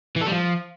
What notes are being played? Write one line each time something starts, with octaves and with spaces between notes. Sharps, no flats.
E3
A4
G3
F3